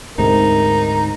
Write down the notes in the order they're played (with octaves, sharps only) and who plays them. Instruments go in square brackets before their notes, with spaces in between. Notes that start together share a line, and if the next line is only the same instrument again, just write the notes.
[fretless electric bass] D2 G#2 C3 [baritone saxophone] D#4 [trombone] A#4